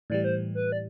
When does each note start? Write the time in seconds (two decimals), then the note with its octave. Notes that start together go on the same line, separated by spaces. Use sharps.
0.10 A2 E3 G3 D5
0.24 C5
0.55 B4
0.72 D5